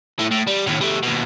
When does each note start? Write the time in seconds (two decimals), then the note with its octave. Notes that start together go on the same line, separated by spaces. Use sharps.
0.19 A2 A3
0.31 A2
0.47 G3
0.67 D#2 A2
0.81 G3 A3
1.03 D#2 B2